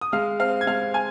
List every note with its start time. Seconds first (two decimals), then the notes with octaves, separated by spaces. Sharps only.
0.01 D#6
0.12 G#3 F5 F6
0.40 C4 F5 F6
0.61 G#6
0.67 G#3 F5 F6
0.94 G#5 G#6